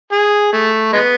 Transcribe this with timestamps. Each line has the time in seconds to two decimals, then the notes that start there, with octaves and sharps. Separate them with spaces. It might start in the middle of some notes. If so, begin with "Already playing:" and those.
0.12 G#4
0.53 A3
0.93 G#3 B3